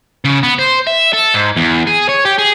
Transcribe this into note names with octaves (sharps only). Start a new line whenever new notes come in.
C#3
B3
C5
E5
A4
G#2
E2
G#4
C#5
G4
G#4